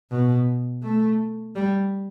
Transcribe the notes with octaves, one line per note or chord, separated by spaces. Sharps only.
B2
A3
G3